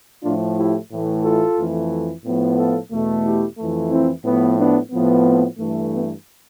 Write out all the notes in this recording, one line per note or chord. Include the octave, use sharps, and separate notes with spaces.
A2 F3 A3 D4 F4
E4 G4
A2 E3 A3
F4 A4
F2 E3 A3
A2 F3 B3
F4 A4
E2 B2 A3
E4 G4
F2 E3 A3
C4 E4
A2 F3 B3
B3 D4
A2 F3 B3
C4
G2 E3 A3
B3